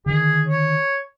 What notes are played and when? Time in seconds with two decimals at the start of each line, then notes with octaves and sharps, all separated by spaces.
0.06 D3 D#3 G#4
0.48 C#5